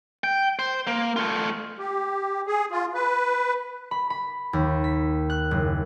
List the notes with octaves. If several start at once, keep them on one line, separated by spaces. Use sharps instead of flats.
G5
C5
A#3
A3 F4
G4
G#4
F4
B4
B5
B5
D#2
B6
F#6
F#1